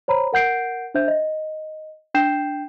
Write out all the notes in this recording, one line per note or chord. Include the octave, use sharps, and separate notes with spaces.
C5 C#5 A#5 B5
A#4 F#5 G6 C7 D7
D4 C5 E5 G6
D#5
D4 G5 G6 C7 E7